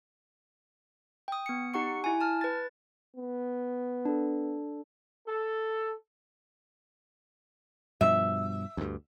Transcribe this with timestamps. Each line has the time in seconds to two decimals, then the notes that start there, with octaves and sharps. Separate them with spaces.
1.28 G5 D#6
1.46 B3 C#7
1.74 D#4 G4 F#5 C#6 C#7
2.04 E4 G#5
2.21 A5 F6
2.41 B4 A6
3.17 B3
4.05 D4 A4
5.27 A4
8.01 G2 B2 F3 E5
8.77 D2 G2